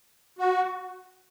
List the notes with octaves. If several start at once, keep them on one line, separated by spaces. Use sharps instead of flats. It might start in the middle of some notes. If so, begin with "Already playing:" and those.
F#4